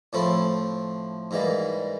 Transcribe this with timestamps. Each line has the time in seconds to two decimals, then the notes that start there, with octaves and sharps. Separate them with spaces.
0.13 A2 F3 A3 C4 E4
1.31 G#2 E3 G3 A#3